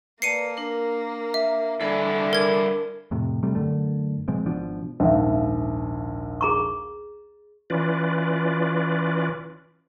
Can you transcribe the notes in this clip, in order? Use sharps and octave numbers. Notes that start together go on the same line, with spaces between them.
A#3 B4 D5 A5 C7 C#7 D#7
D4 A#4
E5
G2 D3 E4 A4 G#5
A#4 G#6
F2 A2 C3
C3 G3 A3
F#2 D3 A3
B2 F3 G#3 C4
G#1 B2 F3 D4
A#1 D#2 G#2 C#4 E5
G#4 A#5 C#6
E3 C#4 F4 B4 D5